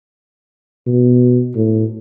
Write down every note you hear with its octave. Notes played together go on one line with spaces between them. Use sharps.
B2
A2